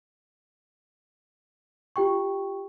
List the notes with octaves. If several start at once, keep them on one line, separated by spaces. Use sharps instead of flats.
F4 G4 G5 C#6